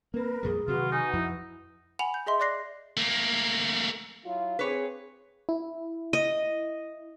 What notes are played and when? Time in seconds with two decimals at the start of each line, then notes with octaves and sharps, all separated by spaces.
0.14 A#3 C4 A#4 B4
0.43 F2 A#2 G3 G#4
0.68 C3 D#3 F#3 F4 F#4 B4
0.92 D#4 G#5
1.13 F2 F3 E4
1.99 F#5 G#5 B5 F7
2.14 G6
2.27 G#4 D#5 E5 C6
2.40 D5 D6 F#6 A#6 C7
2.97 A3 A#3
4.25 F#3 E4 F4
4.59 C4 G#4 B4 C#5
5.49 E4
6.13 D#5